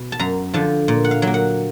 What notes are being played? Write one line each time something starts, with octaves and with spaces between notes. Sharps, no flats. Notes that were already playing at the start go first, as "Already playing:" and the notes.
Already playing: B2
A5
F#2 A#5
D3 F3 A5
A#2
F#5
F5
F#3 A#3
F#5